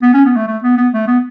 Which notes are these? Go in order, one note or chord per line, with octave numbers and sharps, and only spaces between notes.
B3
C#4
B3
A3
A3
B3
B3
A3
B3